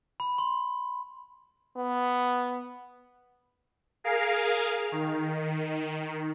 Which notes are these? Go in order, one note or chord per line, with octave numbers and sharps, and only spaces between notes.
B5
C6
B3
G#4 A#4 F5
D#3